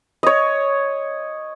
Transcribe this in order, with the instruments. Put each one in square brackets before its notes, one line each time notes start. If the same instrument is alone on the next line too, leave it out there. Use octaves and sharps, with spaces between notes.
[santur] C#5 D#5